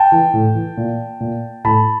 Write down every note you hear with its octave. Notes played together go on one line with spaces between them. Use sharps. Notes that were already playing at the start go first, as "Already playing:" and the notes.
Already playing: G5 A5
E3
A2
E3
A#2
A#2
A2 A5 B5